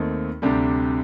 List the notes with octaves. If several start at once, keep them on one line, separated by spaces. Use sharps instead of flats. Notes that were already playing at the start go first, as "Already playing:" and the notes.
Already playing: D#2 D#3 A3 C4 D#4
D2 C3 G3 D4 G4